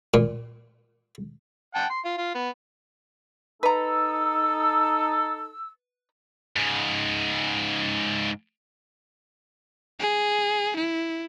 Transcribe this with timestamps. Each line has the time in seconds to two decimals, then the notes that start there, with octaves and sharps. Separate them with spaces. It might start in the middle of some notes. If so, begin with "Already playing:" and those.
0.14 A#2
1.75 F#5 G5 A5
1.90 C6
2.05 F4
2.18 F4
2.35 B3
3.63 D#4 A4 B4 A#5 E6
6.56 G#2 C#3
10.00 G#4
10.76 E4